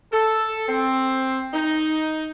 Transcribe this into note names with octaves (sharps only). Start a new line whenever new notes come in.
A4
C4
D#4